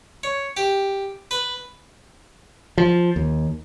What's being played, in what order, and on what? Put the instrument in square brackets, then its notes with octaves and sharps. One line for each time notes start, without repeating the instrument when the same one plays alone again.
[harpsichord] C#5
G4
B4
[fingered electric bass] F3
D#2